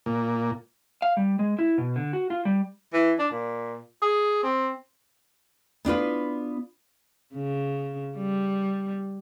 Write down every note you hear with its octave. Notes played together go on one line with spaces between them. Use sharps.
A#2
F5
G3
G#3
E4
B2
D3
F#4
F4
G3
E3
D4
A#2
G#4
C4
B3 D4 F4 B4
C#3
G3